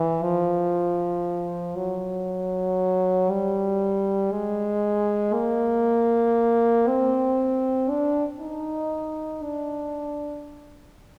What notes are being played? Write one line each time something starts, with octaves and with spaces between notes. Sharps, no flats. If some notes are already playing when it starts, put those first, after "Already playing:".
Already playing: E3
F3
F#3
G3
G#3
A#3
C4
D4
D#4
D4